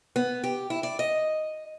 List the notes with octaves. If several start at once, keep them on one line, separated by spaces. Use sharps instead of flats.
B3
G4
E4
D5
D#5